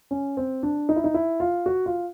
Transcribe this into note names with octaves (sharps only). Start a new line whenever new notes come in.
C#4
C4
D4
D#4
E4
D#4
E4
F4
F#4
F4